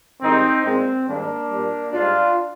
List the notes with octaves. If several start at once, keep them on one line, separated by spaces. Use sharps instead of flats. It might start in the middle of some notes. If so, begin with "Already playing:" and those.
G#2 D#3 G3 C4 D#4
A#2 G#3 C4
G#2 D#3 G3 A#3 D4
A#2 G3
G#2 G3 D4 F4